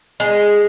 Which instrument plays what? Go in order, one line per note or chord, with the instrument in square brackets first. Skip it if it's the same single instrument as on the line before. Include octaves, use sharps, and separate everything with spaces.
[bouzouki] G#3